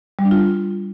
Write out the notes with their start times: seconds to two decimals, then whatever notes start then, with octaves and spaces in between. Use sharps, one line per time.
0.19 G3
0.25 D4
0.31 F4